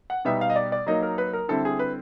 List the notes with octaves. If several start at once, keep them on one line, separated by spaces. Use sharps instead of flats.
F#5
B2 G3 B3 D#4 E5
F5
D#5
D5
D5
F#3 A#3 D#4 D#5
A#4
B4
A#4
D3 G3 C4 E4 A4
G#4
B4